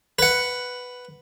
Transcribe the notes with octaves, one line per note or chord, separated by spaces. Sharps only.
B4 F#5